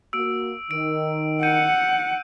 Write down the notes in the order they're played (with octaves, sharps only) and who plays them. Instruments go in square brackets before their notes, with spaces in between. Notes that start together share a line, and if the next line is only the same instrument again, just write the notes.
[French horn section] A#3 F#4 [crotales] E6 D7
[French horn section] D#3 [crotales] D7
[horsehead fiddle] F#5 [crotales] G6 C#7 D#7